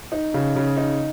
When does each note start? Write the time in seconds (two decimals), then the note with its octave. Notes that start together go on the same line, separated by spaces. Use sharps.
0.12 D#4
0.34 C#3
0.56 C#3
0.77 D#4